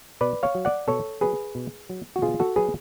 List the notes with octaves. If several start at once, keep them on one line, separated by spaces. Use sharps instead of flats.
B2 B4 D5
C#5 F5
F#3
D5 F#5
B2 A4 C#5
F#3 G#4 B4
B2
F#3
F#4
B2 F4 G#4
F#4 A4
F#3 G#4 B4